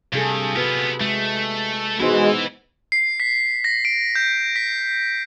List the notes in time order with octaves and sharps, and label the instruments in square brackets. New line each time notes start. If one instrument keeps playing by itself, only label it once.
[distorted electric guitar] G2 [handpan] C3 G#4 A4
[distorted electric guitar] B3 F4 [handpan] F#4 B4
[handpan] G#3 [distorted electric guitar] A3
[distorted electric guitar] E3 E4 [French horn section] G#3 F#4 [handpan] B3 D#4 C5
[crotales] C7
B6
A#6
D7
G6
B6